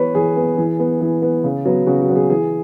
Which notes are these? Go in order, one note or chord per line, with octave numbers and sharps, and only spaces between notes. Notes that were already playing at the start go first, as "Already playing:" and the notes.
Already playing: E3 B3 B4 C#5
E3 G#4
B3
E3
B3
E3
B3
C#3
F#3 B3
C#3 F#4
F#4
F#3 B3
G#4
E3 G#4